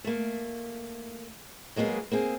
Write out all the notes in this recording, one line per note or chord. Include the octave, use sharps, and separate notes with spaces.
A3 A#3
F#3 G#3 A#3 B3 G#4
A#3 C4 G#4